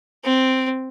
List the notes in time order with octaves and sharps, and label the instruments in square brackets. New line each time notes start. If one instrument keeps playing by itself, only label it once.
[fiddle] C4